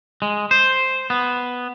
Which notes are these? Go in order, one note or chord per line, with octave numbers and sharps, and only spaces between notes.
G#3
C5
B3